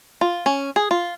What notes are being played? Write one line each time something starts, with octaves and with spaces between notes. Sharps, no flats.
F4
C#4
G#4
F4